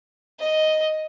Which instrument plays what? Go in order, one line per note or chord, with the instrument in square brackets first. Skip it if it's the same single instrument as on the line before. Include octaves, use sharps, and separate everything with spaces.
[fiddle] D#5